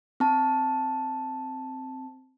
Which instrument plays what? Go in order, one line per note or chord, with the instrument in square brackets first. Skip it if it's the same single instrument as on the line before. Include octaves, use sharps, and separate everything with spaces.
[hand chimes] C4 A5